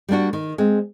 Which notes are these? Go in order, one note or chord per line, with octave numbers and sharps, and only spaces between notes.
G3 A#3 D4 F#4
D#3
G#3 C4